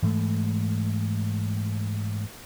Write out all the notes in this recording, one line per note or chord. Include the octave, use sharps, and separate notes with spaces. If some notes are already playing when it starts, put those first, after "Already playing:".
G#2 E3 G#3 A3